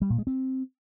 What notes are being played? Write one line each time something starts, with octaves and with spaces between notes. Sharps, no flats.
G3
A#2
G#3
C4